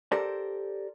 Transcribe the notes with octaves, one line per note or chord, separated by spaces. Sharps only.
G4 A4 A#4 C5 D5 A5